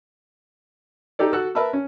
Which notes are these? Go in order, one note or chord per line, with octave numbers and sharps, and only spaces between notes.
D#4 G4 A4 D5
F#4 A4 E6 F#6
A#4 B4 E5 A5 B5 E6
C#4